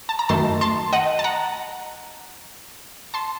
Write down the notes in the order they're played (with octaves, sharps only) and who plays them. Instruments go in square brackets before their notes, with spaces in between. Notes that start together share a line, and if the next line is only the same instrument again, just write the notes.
[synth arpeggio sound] A5
A#5
F#2 D#3 A3 A5 C6
A5 C6
D#5 F#5
A5
F#5 A#5
A5 C6